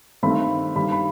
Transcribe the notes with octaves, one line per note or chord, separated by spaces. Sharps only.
G2 D#3 A3 C4 B5
G2 D#3 G3 B5
B5